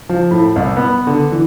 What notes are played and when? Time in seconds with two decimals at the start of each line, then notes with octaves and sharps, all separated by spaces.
0.09 F3
0.31 A2
0.56 C2
0.77 B3
1.07 D3
1.32 E3